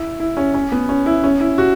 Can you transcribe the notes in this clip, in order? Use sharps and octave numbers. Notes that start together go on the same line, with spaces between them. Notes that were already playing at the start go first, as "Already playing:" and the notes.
Already playing: E4
E4
C#4
C#4
B3
C#4
E4
C#4
E4
F#4